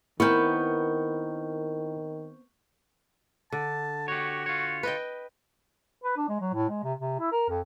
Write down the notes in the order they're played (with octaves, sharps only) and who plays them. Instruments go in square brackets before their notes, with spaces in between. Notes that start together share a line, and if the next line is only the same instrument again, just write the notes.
[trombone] D#3 [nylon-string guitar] B3 C4 [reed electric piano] E4 A#4 [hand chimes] C#6 F6 G6
[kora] D3 [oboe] A5
[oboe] F#4 [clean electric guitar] G4 C#5
[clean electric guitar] F4 C#5
[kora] B4 D#5 G5
[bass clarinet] B4
D4
G#3
F#3
A2
G#3
C3
C3
E4
A#4
F2